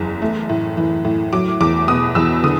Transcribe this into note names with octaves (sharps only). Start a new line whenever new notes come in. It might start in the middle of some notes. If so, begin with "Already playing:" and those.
Already playing: F#1 E2
A3
A2
E3
A2
F#3 D6
E2 D6
B2 D#6
E2 E6
D3 D#6